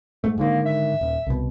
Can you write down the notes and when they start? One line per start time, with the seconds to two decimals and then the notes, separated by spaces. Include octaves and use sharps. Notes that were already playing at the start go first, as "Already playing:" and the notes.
0.24 G#2 A3
0.38 G#2 D3 D#3 A#3
0.66 E5
1.01 D#1
1.27 C2 B2